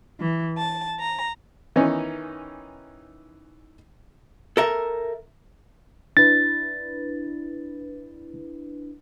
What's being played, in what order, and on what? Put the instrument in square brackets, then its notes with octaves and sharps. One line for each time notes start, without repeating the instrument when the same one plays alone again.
[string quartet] E3
A5
A#5
[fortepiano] D#3 E3 B3 C#4 D#4
[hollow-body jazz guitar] A4 A#4 E5
[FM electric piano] D4 E4 B4 [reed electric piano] A6